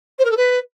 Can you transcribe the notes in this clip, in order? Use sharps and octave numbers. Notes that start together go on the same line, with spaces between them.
C5
A#4
A4
B4